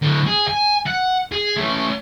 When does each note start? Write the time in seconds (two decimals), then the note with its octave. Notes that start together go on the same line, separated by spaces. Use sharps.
0.03 A2 D3
0.27 G#4
0.48 G#5
0.86 F#5
1.32 G#4
1.56 A3 C#4